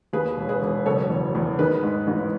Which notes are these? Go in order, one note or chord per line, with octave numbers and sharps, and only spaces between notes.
D#2 G#4 B4
E1
G#4 B4
E1
F#1 A4 C#5
E2
E2
D#3 G#4 B4
G#2
A1